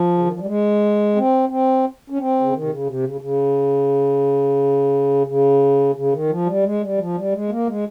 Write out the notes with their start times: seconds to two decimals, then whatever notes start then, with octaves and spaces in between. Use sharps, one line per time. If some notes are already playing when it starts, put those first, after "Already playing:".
Already playing: F3
0.18 C#3
0.25 D#3
0.33 F3
0.39 G3
0.47 G#3
1.16 C4
1.49 C4
2.10 C#4
2.18 C4
2.41 C#3
2.53 D#3
2.63 C3
2.70 C#3
2.87 C3
3.04 C#3
3.21 C#3
5.27 C#3
5.95 C#3
6.13 D#3
6.30 F3
6.46 G3
6.64 G#3
6.81 G3
6.98 F3
7.16 G3
7.32 G#3
7.50 A#3
7.67 G#3